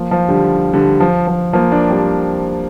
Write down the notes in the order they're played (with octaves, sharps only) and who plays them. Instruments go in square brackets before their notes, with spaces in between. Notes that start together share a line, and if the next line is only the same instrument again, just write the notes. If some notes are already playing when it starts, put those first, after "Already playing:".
Already playing: [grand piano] F3 A#3
F3
D3 G3
D3 G3
F3
F3
F3 A#3
A#3 D4
G3 C4